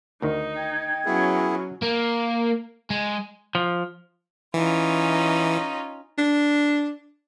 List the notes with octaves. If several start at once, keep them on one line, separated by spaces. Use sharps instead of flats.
D2 D#3 D#4
G5 G#6
F#3 B3 C#4 E4 G#4
A#3
G#3
F3
E3 C#4 D#4 F4
D4